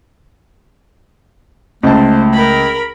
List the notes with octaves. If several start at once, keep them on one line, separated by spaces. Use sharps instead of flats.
C#2 A3 C5 A5
A#4 B5